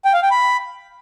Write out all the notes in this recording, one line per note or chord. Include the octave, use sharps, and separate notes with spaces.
G5
F5
G5
B5